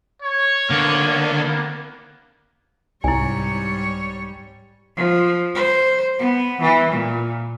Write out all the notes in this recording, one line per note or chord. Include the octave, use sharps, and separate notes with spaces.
C#5
D3 A#3 B3
C2 G#2 G3 E4 C#5 G#5
F3
C5
B3
E3
A#2